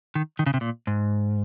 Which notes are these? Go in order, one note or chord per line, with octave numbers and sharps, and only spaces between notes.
D#3
D#3
C#3
C3
A#2
G#2